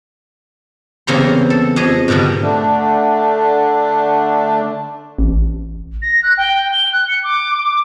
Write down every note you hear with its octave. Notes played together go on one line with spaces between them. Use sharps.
E2 C#3 A#3 C4 A#5 C6
A4
F2 G#4 D#5
G#2 B2 D3 D#3 G3
D3 A3 D4
A1
A#6
F#6
G5
G7
F#6
C#7
D6
D6